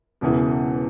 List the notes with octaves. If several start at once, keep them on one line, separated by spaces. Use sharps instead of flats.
E1 E2 C#3 E3